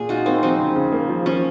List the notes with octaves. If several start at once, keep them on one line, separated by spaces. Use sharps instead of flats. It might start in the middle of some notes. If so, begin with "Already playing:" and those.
Already playing: A#2 G#4
D#4 F4 F#4
A#3 C4 D#4
F3 C4 D#4
C#3
C#3
A#3
F3
F3 C#4